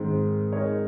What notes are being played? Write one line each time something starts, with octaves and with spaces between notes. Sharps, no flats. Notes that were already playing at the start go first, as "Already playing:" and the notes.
Already playing: G#2 D#3 G#3 C4
G#3 D#4 A#4 C#5